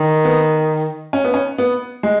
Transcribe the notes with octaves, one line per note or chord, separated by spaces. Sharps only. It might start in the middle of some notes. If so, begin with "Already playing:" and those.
Already playing: D#3
B3
C#4
B3
C#4
B3
G#3